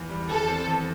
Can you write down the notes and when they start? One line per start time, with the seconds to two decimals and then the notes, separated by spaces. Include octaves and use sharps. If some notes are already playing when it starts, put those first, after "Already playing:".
Already playing: E2
0.09 G3
0.29 E2 A4
0.48 C4
0.68 E2